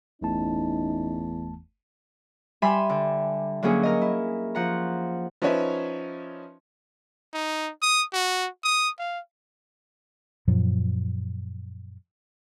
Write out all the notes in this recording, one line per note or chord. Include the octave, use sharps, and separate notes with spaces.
G1 E2 A3 C#4 D#4 A5
G3 E5 G#5 B5 C6
D3
D3 F#3 A#3 C#4 G#4
A#4 D#5
E4
F3 F#5 A#5
F3 C#4 D#4 B4 C#5 E5
D#4
D#6
F#4
D#6
F5
F#2 A#2 F3 F#3